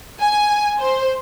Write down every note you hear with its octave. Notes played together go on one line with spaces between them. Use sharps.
G#5
C5